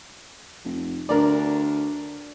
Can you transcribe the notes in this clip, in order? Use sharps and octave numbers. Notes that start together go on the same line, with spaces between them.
F1
D2 D4 A#4 D5